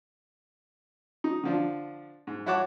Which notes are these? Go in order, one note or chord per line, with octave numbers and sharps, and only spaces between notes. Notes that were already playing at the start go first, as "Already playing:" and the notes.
D#4
D3 F3 D4
G#2
E4 F#4 C#5 F#5 A5 D6